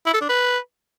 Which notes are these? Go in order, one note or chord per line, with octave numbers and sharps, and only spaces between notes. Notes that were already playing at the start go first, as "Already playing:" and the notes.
E4
A4
D4
B4